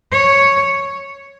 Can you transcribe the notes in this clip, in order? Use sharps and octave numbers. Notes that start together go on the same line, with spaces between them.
C#5